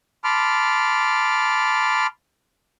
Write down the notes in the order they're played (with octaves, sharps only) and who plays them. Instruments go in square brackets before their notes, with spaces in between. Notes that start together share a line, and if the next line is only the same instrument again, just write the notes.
[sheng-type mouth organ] A5 B5 C6 D6 F6